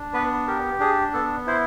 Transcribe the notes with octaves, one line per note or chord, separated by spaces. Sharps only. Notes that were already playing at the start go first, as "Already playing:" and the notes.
Already playing: D4
B3 B4
G4 A#4
D4 G#4
B3 A4
E4 C5